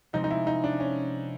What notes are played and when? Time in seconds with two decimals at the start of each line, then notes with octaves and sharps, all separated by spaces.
0.13 C3 F3 G#3 C4 D#4
0.24 D#4
0.30 E4
0.47 D#4
0.64 D4
0.80 C#4